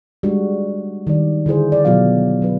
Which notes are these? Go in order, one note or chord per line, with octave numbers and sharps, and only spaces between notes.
G3 G#3 D4 F#4
D#3 G3 D5
D3 E4 G#4 C5
D5
B2 F#3 B3 F4 D5 F5
F#3 B4